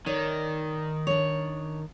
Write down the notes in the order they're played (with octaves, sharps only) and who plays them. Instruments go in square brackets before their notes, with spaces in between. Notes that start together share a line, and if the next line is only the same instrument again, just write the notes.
[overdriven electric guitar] D#3 [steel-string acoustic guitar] C#5 D5
[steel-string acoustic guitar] D4 C#5